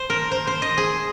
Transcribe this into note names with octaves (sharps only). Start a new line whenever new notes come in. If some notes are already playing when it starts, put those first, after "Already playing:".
Already playing: C5
A#4
C5
C5
D#5
G#4